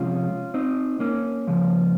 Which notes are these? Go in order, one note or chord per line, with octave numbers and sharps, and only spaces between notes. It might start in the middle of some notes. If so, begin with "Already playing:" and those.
Already playing: C3 F3 G#3 C#4 F4
C4 D#4
A#3 C#4
C#3 F3 G#3